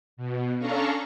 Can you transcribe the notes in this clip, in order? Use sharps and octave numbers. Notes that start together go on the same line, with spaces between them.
B2
C#4 D4 A4 F5 A#5 C#6